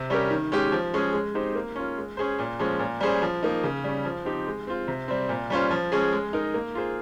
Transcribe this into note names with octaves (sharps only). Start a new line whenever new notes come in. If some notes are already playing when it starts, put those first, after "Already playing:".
Already playing: C3
G3 C#4 G4 A#4
D#3
G#3 C#4 G4
F3
G#3 C#4 G#4
G#3
C4 D#4 G4 C5
A#3
C#4 F4
G#3
C#4 G#4 C5
A#2
F3 G#3 C#4
A#2
G3 C#4 G#4 C5
F3
A#3 D#4
C#3
G3 C#4
F3
C4 D#4 G4
G#3
C4 F4
C3
G3 C4
A#2
G3 C#4 F4 C5
F3
G#3 C#4 G#4
G#3
D#4 A#4
A#3
F4 G#4 C5